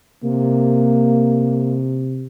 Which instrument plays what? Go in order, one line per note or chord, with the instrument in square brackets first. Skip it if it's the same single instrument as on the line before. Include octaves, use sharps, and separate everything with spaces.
[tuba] C3 [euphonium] A#3